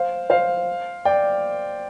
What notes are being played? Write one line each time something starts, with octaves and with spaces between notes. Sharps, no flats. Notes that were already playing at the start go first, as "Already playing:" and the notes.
Already playing: C5 F5
C5 F5
D5 G5